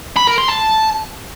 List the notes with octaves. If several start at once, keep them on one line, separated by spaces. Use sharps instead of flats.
B5
A#4
C6
A5